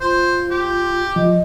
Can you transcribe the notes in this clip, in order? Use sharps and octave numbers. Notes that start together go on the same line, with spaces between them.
F4 C5
G4
F3 D#5